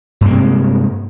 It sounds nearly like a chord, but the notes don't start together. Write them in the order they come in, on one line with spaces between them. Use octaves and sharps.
G2 A#3 C3 G#3